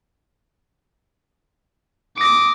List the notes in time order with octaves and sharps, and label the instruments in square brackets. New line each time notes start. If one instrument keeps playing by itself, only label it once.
[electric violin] D6 D#6 [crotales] A#6 D7